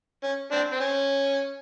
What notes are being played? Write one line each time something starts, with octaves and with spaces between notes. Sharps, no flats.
C#4
C4 D4
C4
C#4